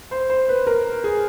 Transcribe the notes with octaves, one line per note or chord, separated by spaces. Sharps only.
C5
C5
B4
A#4
G#4